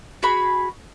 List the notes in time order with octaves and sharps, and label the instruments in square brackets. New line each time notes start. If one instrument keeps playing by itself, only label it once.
[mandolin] F#4 G#4 B5